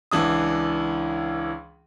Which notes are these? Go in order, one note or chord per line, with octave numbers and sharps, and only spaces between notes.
C#2 E3 D4 D#6